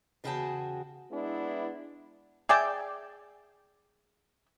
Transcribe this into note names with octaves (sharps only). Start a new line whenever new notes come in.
E2 C#3 F#4 G#4 G5 A5
G#3 B3 D4 E4
G#4 D5 E5 G5